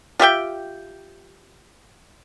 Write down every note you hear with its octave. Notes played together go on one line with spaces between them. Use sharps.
F4 G4 E5 G5